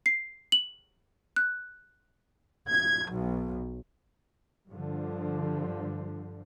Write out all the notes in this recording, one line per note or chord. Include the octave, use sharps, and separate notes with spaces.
C7
F#7
F#6
G#6
B1
G2 D3 F3